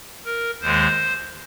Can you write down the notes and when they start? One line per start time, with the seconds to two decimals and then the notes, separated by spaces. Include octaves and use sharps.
0.25 A#4
0.61 D#2 D#3 G#3 C5